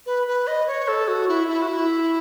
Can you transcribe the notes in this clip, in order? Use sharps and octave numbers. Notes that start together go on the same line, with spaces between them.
B4
B4
D#5
C#5
A4
F#4
E4
E4
F#4
E4